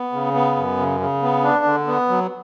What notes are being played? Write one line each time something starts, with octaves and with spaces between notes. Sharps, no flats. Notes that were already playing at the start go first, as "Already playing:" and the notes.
Already playing: B3
C#3
B3
F#2
C#3
C#3
B3
D4
D3
B3
F#3